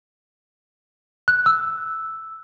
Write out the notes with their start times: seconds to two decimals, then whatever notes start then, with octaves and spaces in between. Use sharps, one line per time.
1.28 F#6
1.46 E6